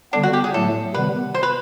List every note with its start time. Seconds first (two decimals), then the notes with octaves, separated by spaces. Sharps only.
0.13 D3 G3 B3 D4
0.23 F#4
0.33 G4
0.44 G#4
0.54 A2 F#3 A3 A4
0.94 C3 D#3 G3 B3 B4
1.34 C5
1.43 B4